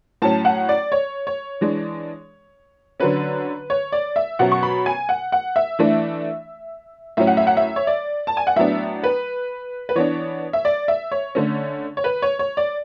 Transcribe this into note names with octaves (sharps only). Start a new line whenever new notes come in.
A2 F#3 C#4 A5
F#5
D5
C#5
C#5
E3 G#3 D4
D3 F#3 C#4 B4
C#5
D5
E5
B2 F#3 C#4 F#5
C#6
B5
G#5
F#5
F#5
E5
E3 A3 D4
A2 F#3 C#4 E5
F#5
E5
F#5
E5
C#5
D5
A5
G#5
F#5
A2 F#3 B3 D4 E5
B4
B4
E3 B3 D4 C#5
E5
D5
E5
C#5
D3 A3 C#4
C#5
B4
C#5
C#5
D5